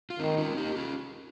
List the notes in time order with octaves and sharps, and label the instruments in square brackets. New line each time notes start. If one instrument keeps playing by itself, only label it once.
[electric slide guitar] F4
[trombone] D#3 [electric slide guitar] C4 D#4
[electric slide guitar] C#4 F4
D#4 G4
C#4 F4